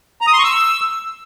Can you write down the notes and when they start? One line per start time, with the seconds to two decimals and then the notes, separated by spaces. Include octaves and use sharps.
0.21 A#5
0.27 D#6
0.33 C6
0.39 C#6
0.44 E6